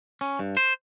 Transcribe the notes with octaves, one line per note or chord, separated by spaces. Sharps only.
C#4
G2
C5